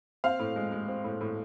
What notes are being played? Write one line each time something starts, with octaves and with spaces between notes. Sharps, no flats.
C4 F5
A2
G#3
G#3
C4
A2
A2